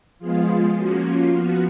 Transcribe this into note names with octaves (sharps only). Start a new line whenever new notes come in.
F3 G#3 B3 F4 G#4
F3 A#3 C#4 F#4
F4
F3 B3 F#4